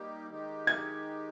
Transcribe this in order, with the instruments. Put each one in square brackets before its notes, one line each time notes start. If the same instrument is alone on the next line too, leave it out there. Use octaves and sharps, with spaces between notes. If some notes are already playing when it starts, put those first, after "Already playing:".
Already playing: [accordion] G3 A#3 D#4 G4
D#3 G#3 D#4 G4
[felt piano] G#6